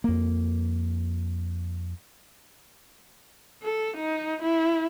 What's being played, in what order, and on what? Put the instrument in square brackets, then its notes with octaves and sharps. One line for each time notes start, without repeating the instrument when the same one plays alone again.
[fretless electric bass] F2 A#3
[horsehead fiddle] A4
D#4
E4